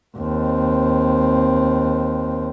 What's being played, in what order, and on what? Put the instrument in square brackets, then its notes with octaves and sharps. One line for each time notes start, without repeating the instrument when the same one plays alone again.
[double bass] D#2 C4